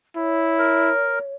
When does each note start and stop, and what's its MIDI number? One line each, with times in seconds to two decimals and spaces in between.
0.16 0.90 64
0.16 1.34 73
0.59 1.19 70